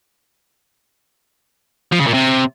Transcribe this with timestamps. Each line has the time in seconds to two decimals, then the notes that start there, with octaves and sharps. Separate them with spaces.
1.92 F3
1.99 C#3
2.06 A#2
2.14 C3